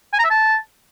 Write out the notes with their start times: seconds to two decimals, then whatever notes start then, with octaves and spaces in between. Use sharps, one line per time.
0.13 G#5
0.19 A#5
0.25 E5
0.30 A5